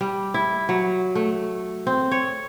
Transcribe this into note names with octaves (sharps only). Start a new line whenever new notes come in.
G3
E4
F#3
A3
C4
C#5